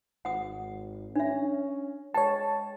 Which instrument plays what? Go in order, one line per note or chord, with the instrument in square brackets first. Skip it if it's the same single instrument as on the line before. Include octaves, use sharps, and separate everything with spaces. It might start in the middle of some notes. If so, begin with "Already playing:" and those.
[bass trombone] G#1 [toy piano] F#5 D#6
[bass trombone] C#4 [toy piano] D4 E5
[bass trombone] G#3 [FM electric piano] C#5 A5 [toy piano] G5